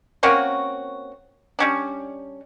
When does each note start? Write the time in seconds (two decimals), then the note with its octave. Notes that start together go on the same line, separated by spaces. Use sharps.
0.23 A#3 C4 C#4 F#4
1.59 G3 C#4 D4